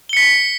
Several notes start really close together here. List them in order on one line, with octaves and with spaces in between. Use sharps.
G7 C#7 B6